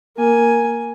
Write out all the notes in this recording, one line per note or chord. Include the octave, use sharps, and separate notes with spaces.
A#3 G#5